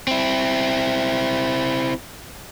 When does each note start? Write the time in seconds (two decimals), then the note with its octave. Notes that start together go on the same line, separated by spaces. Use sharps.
0.08 C4 E4